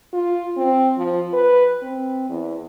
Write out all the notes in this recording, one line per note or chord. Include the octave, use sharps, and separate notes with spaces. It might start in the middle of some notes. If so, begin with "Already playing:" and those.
F4
C4
F3
B4
C4
E2